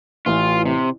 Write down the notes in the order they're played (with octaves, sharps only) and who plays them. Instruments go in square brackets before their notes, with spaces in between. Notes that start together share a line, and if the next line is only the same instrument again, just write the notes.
[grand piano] A1 A2 E3 [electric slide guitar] F4
[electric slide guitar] C3